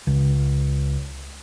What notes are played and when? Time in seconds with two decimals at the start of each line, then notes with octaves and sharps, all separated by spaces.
0.07 C#2